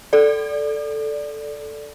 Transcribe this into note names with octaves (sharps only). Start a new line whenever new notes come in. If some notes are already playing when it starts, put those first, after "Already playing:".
A4 D5